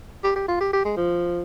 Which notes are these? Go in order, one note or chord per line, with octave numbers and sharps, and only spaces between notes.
G4
G4
F4
G4
G4
G#3
F3